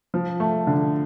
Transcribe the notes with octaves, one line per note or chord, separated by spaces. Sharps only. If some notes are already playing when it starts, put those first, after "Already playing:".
F3
A3
D3